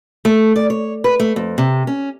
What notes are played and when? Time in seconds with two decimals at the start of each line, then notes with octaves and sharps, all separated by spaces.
0.25 A3
0.56 D5
0.70 C#5
1.04 B4
1.20 A3
1.36 F2
1.58 C3
1.87 C#4